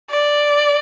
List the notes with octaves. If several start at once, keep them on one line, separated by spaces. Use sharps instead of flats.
D5